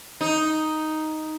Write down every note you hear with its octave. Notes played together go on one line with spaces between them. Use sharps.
D#4